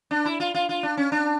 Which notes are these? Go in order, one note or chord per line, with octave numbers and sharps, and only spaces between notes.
D4
E4
F4
F4
F4
D4
C#4
D4